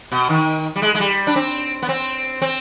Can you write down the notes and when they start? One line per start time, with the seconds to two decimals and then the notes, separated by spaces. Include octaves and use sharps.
0.12 B2
0.29 D#3
0.76 G3
0.82 G#3
0.95 G#3
1.00 G3
1.27 D4
1.36 C4
1.82 B3
1.89 C4
2.42 C4